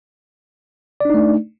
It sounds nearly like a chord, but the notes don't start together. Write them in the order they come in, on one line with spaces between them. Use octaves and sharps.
D5 D4 D#4 A3